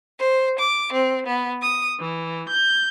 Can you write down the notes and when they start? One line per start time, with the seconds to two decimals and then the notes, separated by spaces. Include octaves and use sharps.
0.19 C5
0.59 D6
0.92 C4
1.26 B3
1.61 D#6
2.00 E3
2.49 G6